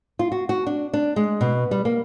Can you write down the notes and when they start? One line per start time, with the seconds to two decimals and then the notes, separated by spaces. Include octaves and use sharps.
0.19 F4
0.32 F#4
0.49 F#4
0.67 D4
0.93 D4
1.16 G#3
1.41 B2
1.71 G3
1.85 A#3